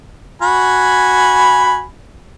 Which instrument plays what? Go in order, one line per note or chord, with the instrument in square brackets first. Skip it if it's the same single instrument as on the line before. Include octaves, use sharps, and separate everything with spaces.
[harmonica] F#4 G#5 B5